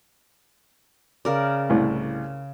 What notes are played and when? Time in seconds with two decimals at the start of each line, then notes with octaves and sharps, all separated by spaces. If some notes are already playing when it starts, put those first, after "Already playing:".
1.25 C#3 A#4 D5
1.70 C2 A2